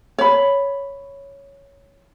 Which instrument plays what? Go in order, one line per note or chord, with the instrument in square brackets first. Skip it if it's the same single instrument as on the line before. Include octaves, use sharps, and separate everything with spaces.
[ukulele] C#5 B5